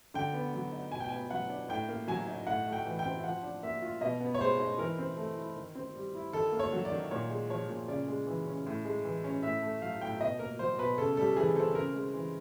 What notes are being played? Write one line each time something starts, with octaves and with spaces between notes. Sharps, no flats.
D3 G5
B3
F#3
D#4
B2 G#5
G5
B3 G#5
F#3 F#5
D4
A2 G5
A#3
F#3 G#5
D#4
A2 F#5
A3
G5
E3
G5
C4
F3 F#5
D4
A#3 E5
F4
B2 D#5
B3
C#5
G#3 C5
D#4
E3 A#4
C4
A3
E4
D#3
C4
G3
E4
D#3 A4
A#3
C#5
F#3
D5
D#3
A#2 C#5
G#3
F3 C#5
A#2
C#3 D5
G#3
E3
C#4
A2
G#3
E3
C#4
A2 E5
A3
F#3 F5
A2 G5
B2 D#5
A#3 A#4
F#3 C5
B2 B4
C#3 A4
G3 A4
E3 G#4
C4 A4
C#3 A#4
G#3
E3